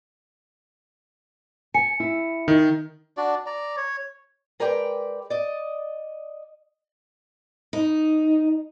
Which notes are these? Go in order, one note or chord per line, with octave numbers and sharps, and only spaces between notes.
G#5 C#7
E4
D#3 D#4
D4 F#4 D5
D5 A#5
C#5
G#3 A#4 B4 D5 G5
D5 D#5
D#4